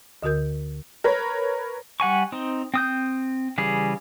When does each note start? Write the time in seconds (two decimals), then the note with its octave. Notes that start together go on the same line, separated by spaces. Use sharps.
0.23 D2 D3 F#4 A#4 G6
1.04 A#4 B4 C#5
2.00 G3 F#5 G#5 C#6
2.32 C4 D#4
2.74 C4 D#6 G6
3.58 C#3 E3 G3 G#4